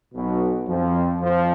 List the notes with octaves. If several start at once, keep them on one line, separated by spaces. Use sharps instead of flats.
B1 B2
F2 F3
F2 F3